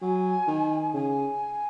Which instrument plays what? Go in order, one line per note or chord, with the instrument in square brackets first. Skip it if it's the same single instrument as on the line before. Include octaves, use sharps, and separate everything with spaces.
[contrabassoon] F#3 [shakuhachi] G#5
[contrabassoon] D#3
[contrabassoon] C#3 [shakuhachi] G#5